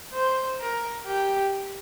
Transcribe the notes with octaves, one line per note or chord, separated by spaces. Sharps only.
C5
A#4
G4